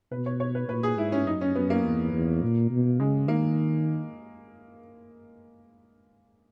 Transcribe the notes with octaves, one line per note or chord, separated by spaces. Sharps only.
B2 B4
C#5
C#5
B4
A#2 B4
G#4
G#2 E4
C#4
F#2 D#4
C#4
F#2 B3
A#3
E2
E2
A#2
B2
C#3 G#3
D#3 A#3